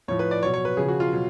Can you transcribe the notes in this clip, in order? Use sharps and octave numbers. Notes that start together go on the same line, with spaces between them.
A2 F3 C#5
B4
D5
B2 F#3 C#5
C#5
B4
C#3 F3 G#4
F#4
F4
B2 F#3